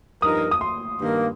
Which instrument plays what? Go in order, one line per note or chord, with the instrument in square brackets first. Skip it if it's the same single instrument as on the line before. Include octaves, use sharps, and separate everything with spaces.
[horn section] G2 F3 D#4 A#4 [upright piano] D#6
[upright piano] D#6
C6
[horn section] G2 D#3 A#3